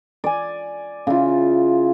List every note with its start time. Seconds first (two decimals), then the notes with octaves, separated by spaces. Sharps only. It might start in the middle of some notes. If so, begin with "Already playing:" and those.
0.24 D5 G#5
1.07 C#3 E4 F4